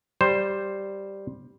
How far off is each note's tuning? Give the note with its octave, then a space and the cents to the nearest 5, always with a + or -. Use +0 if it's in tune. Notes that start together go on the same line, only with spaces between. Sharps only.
G3 +0 C5 +5